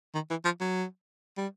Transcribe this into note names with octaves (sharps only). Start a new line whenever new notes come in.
D#3
E3
F3
F#3
G3